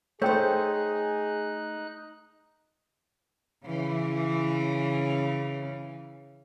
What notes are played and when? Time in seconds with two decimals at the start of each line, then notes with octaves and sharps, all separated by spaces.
0.22 A3 D#4 G#4 C5 C#5 G5 F#6
3.65 C#3 E3